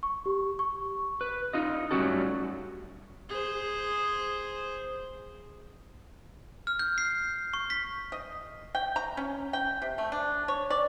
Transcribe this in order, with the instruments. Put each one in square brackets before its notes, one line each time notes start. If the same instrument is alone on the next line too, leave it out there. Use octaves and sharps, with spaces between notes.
[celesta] C#6
G4
C#6
[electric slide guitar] B4
D#4 F4 D#5
F#3 G3 A3 C#4 F#4 A4
[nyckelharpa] G#4 C5
[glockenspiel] F6
G6
C7
C#6
B6
[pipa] D#5
G5
A#5
C#4
G5
C3
A3
D4
C#5
D5